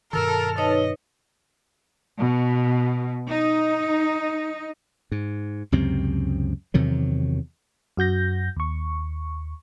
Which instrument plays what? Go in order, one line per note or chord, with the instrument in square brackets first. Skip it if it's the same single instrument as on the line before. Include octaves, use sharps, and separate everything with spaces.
[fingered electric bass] G2 B2 D#3 [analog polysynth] A4 F6 [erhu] A#4
[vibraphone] D#4 B4 C#5 [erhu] D#5
[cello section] B2
D#4
[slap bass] G#2
C#2 F#2 C3 C4
E2 C3 D#3 F#3
[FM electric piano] F#2 F#4 G6 A#6
D#2 C#6